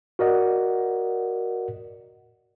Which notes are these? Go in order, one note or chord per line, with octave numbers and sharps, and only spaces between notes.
F#4 A#4 D5 D#5 F#5